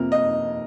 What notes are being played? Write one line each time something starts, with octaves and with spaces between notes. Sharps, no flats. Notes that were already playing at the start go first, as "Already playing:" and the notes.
Already playing: F2 C3 F3 A#3 A#4
D#5